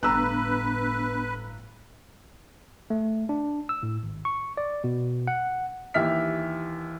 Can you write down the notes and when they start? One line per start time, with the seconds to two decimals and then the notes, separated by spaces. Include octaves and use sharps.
0.03 G1 A2 B3 D4 B4 A#5 E6 F#6
2.90 A3
3.29 D4
3.69 E6
3.83 A2
4.03 G#1
4.25 C#6
4.57 D5
4.84 B2
5.27 F#5
5.94 D#2 E3 G4 E5 F6 B6